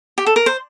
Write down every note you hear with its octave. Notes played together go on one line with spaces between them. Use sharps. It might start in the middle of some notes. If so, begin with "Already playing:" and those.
G4
A4
A#4
C5